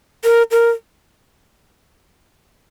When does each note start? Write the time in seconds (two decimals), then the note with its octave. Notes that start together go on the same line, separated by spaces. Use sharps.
0.24 A#4
0.51 A#4